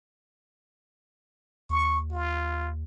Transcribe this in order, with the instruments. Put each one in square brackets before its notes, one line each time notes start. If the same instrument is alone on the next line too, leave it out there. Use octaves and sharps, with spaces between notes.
[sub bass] D#2 [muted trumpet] C#6
[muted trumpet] F4